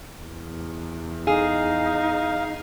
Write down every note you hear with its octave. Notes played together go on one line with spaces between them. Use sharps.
E2
D#4 G#4 F5